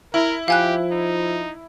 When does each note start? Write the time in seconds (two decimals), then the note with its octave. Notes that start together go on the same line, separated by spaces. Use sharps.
0.14 E4 A#4
0.48 F3 G4 F5 G#5 F#6
0.91 D#4